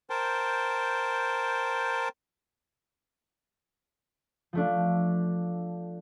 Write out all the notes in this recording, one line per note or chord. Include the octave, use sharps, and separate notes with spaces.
A#4 C5 G5 A5
F3 A3 D4